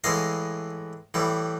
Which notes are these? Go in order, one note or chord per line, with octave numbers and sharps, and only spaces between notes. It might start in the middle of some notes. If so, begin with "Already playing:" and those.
A2 E3 G#3 D#5 F5
A2 E3 G3